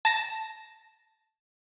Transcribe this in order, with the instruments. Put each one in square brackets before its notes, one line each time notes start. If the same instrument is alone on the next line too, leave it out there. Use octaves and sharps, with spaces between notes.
[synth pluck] A5 A#6 E7